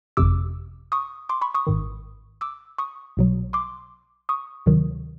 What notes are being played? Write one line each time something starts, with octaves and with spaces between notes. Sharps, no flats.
G1 F2 C3 D6 E6
C#6 D#6
C6 D6
B5 C#6
C#6 D#6
G#1 G#2 D#3
D6 E6
C#6 D#6
B1 B2 F#3
C6 D6
C#6 D#6
D2 C3 D#3 F#3